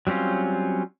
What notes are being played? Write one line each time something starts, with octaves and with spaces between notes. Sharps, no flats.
F#3 G3 C4 C#4 F4